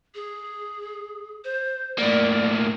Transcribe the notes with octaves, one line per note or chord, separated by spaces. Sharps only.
G#4
C5
A2 A#3 D5